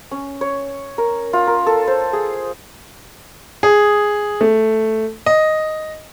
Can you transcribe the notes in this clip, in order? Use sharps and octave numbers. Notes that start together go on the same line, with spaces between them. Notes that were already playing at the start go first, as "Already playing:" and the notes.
C#4
C#5
A#4
F4
A#4
A4
C5
G#4
G#4
A3
D#5